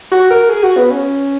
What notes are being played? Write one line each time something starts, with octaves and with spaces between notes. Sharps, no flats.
F#4
A#4
G#4
F#4
B3
C#4